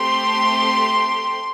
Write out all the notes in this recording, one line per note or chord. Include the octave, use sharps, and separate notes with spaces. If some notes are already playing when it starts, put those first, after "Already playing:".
Already playing: A3 C4 G4 C6